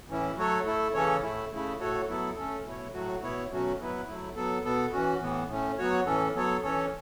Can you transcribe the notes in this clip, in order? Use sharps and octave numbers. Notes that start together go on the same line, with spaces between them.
A2 E3 C#4 E4
F#3 A3 F#4 A4 C#5
A3 E4 A4
C#3 E3 C#4 A4 C#5
A2 A3 E4
C#3 A3 E4
A2 A3 F#4 A4 C#5
F#3 B3 E4 A4
A3 C#4 A4
B2 A3 E4 C#5
A2 F#3 A3 F#4
B2 B3 E4 C#5
B2 F#3 A3 C#4 F#4
F#3 B3 E4 B4
F#3 A3 E4
F#3 B3 A4
B2 B3 A4
E3 C#4 F#4
A2 E3 B3
A2 A3 C#4
F#3 B3 F#4 C#5
A2 E3 C#4 A4
F#3 B3 A4 C#5
E3 C#4 A4 C#5